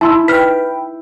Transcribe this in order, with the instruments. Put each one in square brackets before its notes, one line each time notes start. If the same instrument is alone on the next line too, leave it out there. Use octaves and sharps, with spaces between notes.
[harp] E4 [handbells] A5 C6 E6
[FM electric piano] B4 G5 [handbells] F6 B6